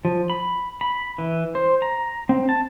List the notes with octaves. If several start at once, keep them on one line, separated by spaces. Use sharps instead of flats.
F3
B5
B5
E3
C5
A#5
C4
A5